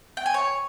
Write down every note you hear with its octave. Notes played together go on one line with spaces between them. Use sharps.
G5
G#5
C#5